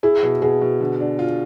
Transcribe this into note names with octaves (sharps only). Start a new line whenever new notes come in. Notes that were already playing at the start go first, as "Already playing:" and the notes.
E4 G#4
B2
B2 G#4
B2
D3
D4
F4